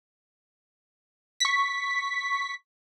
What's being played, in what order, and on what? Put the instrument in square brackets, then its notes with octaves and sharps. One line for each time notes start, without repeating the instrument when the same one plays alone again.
[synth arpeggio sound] C#6 B6